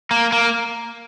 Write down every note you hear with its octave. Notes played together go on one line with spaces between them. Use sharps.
A#3
A#3